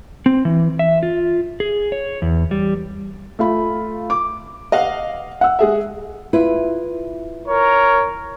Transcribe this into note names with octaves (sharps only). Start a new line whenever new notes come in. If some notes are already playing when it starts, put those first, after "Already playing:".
C4
E3
E5
F4
G#4
C#5
E2
G3
A3 F4 B5
D6
D#5 F5 F#5
F#5 E6
G#3 G#4 E5
E4 F4 B4
A#4 C#5